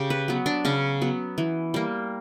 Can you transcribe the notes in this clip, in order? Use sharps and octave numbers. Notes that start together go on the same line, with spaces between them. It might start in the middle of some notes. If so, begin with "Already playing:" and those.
Already playing: C#3 G4
B4
F#3 B3
D4
C#3 C#4
F#3 B3
E3
G3 A#3